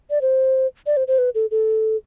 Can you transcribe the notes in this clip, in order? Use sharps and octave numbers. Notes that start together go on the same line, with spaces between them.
D5
C5
D5
C5
C5
B4
A4
A4